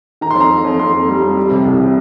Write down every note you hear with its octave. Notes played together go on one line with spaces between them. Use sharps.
D#3 A#5
C6
F2
A#5
F2
F2
F2 C6
F2
G3
F2
G3
C3
C2
C3